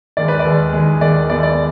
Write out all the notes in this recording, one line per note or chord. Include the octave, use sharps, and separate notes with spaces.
D#2 D#3 G#3 D5
B4
D5
D#2 D#3 G#3
D#2 D#3 G#3
D#2 D#3 G#3 D5
D#2 D#3 G#3 B3 D5
D5